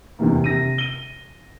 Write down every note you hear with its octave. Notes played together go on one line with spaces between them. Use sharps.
E2 G2 C3 D#3 E3 A#3
C3 A#6 D#7
D#7 G7